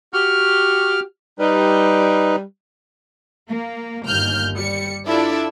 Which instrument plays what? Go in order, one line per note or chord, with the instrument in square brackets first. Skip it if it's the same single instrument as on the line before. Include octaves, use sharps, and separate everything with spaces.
[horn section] F#4 G4 [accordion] F6
[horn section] G3 [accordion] D#4 B4
[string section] A#3
G1 D#2 F6 G6
G3 C#7
D4 E4 F4 A4 D5 E5